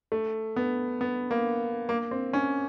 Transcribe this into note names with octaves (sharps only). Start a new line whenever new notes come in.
A3
B3
B3
A#3
A#3
C4
C#4